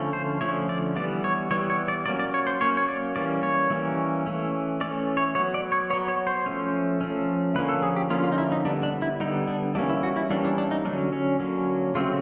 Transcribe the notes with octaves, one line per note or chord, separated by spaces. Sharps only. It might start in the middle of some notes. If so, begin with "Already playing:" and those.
Already playing: D3 F3 A3 C#4
C5
D3 F3 A3 C#4 C#5
D5
E3 G3 B3 D5
C#5
E3 G3 B3 C#5
C#5
D5
F#3 A#3 C#4 D5
D5
C#5
C5
F#3 A#3 C#4 C#5
C#5
D5
E3 G3 A#3 C#4 D5
C#5
E3 G3 A#3 C#4
E3 A3 C#4
E3 A3 C#4 D5
C#5
F#3 B3 C#5
D5
C#5
F#3 B3 C#5
C#5
C5
F3 A3 C#4
F3 A3 C#4
D3 F3 A#3 C#4 B4
A4
G#4
G4
D3 F3 A#3 C#4 F4
F4
D#4
E4
D#4
D3 G3 B3 D4
D4
E4
D3 G3 B3 D#4
D4
E3 G3 A#3 C#4 D4
E4
F#4
E4
E3 G3 A#3 C#4 D4
D4
D4
D#4
D3 F#3 A#3 C#4 D4
C#4
D3 F#3 A#3 C#4
C#3 F#3 A3 C4 F4